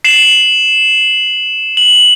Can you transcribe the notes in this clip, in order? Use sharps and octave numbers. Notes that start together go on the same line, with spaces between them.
C7 E7 F#7
F#7